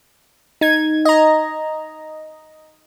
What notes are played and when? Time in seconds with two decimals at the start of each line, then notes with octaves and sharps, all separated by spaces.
0.61 D#4 G#6
1.05 D#5 A#5